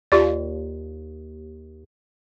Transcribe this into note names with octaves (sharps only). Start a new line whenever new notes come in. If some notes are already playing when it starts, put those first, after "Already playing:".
D#2 F4 G4 D5